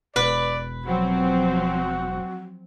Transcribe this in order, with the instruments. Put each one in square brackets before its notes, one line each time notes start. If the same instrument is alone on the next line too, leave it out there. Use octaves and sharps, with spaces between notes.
[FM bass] E1 [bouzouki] B4 [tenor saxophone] D5
[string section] F3 F#3 C4 [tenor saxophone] F#4